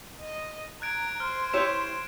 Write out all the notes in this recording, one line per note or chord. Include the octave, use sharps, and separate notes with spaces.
D#5
A#5 F#6 G#6 D7
C5 F6
E4 G4 C#5 E7